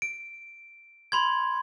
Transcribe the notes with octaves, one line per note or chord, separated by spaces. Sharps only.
D7
B5 C6 G#6